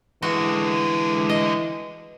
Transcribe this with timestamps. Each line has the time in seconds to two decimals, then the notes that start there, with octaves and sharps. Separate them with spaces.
0.22 D3 E3 G#3 F#4
1.29 D#5